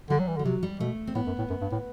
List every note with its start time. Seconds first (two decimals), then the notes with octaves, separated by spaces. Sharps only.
0.10 D3 G3
0.20 F#3
0.28 E3
0.37 D3 G3
0.45 C3 F#3
0.63 G3
0.80 B2 A3
1.07 C4
1.15 A2 B3
1.27 F#2
1.39 A2
1.50 F#2
1.61 G2
1.72 A2